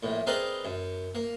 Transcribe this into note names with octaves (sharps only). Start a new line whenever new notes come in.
A#1 A2
C4 G#4 A#4 B4 D5 D#5
F#2
A#3